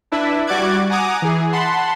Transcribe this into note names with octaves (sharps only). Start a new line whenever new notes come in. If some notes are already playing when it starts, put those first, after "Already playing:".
D4 E4 B4 E5
G3 F#4 D5 D6 F#6 G#6
F#5 G#5 A#5 D6 D#6
E3 G#4
F#5 A5 B5 C6